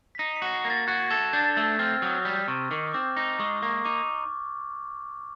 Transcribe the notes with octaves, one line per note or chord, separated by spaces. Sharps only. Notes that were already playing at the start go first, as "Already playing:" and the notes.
B6
D#4 A#6 C7
B6 C#7
F#4
A#6 C7
A#3
A6 B6
F#4 F#6 G#6
A4 G#6 A#6
D4 G6 A6
A3 E6
C4 F6
F#3 D#6
E6
G3 F6
C3 C#6
D#3 D6
C4 D6
D#4
G#3 C#6
A#3 C#6
D#4 D6